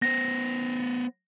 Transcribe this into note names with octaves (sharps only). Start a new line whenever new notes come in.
B3 C5 A#6